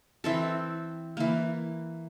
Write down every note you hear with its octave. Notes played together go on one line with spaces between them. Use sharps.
E3 C4 A4
E3 A#3